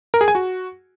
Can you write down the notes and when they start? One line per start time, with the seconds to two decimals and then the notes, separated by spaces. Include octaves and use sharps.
0.14 A#4
0.21 G#4
0.28 G#5
0.35 F#4